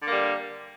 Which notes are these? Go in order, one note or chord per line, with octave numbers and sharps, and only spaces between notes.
D3 G3 A#3